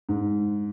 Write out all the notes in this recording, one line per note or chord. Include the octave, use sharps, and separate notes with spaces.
G#2